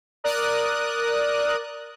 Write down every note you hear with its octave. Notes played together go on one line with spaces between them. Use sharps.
A#4 D5 D#6 F#6